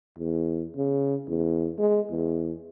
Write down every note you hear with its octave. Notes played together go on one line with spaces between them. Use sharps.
E2
C#3
E2
G#3
E2